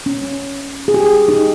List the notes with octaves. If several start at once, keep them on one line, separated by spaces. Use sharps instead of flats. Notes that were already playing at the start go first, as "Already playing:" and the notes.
C#4
G#4
G4
D#4